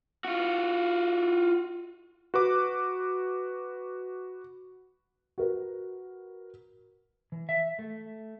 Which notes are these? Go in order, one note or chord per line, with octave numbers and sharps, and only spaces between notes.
F4 F#4
F#4 B4 D6
F#4 A#4 B4
E3
E5
A3